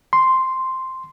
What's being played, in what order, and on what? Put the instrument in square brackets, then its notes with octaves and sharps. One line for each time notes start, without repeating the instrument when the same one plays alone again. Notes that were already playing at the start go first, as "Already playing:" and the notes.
[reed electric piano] C6